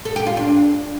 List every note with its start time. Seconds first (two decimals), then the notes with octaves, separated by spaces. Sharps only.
0.05 A4
0.16 G4
0.26 F4
0.37 D4